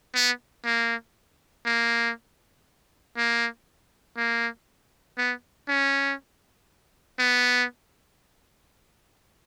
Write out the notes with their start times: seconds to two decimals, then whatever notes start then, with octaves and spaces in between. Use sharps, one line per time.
0.15 B3
0.65 A#3
1.66 A#3
3.17 A#3
4.17 A#3
5.18 B3
5.69 C#4
7.19 B3